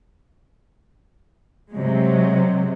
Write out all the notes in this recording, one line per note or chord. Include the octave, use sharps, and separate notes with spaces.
C3 F#3 G#3